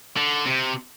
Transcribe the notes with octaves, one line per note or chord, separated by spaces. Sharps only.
D3
C3